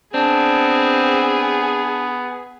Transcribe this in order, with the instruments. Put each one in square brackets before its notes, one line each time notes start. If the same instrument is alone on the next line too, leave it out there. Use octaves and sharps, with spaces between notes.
[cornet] B3 [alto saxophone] C4 [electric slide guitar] D4 [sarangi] G#4